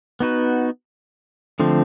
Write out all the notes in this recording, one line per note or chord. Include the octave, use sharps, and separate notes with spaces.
B3 D#4 F#4 B4
D3 F3 A3 C4